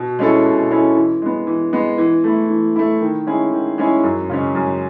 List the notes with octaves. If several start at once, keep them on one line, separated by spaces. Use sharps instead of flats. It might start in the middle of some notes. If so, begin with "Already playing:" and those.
Already playing: B2
G#3 C#4 E4 A4
B2
G#3 C#4 E4 A4
E3
G#3 B3
E3
G#3 B3
E3
A3 E4
E3
A3 E4
D#3
G#3 C#4 E4 G#4
D#3
G#3 C#4 E4 G#4
F#2
C#3 G#3 C#4
F#2